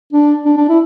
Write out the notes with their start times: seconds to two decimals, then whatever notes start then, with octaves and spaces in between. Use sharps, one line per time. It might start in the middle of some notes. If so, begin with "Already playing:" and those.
0.13 D4
0.45 D4
0.57 D4
0.69 E4